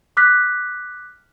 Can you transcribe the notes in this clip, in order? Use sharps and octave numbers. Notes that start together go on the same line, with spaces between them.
D6 F6 F#6 B6